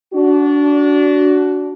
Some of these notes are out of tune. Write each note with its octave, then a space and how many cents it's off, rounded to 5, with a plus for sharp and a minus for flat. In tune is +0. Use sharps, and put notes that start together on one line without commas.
D4 -20 F#4 +10